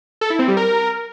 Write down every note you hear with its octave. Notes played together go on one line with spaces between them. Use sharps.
A4
E4
C4
G3
A#4